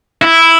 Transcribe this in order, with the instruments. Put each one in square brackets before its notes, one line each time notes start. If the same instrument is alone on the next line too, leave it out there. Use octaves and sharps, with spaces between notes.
[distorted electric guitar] E4